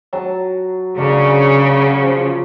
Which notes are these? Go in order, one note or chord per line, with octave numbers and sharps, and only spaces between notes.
F#3 A5
C#3 A#3 D4 A4
F#5
F3